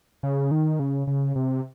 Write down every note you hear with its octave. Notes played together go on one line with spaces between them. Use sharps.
C#3
D#3
C#3
C#3
C3